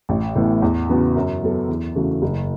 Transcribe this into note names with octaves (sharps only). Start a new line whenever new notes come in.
A1
A2 E3 B3
E2
C#3 E3 B3 F#4
F#2
F#3 B3 A4
E2
C#3 E3 A3 F#4
F#1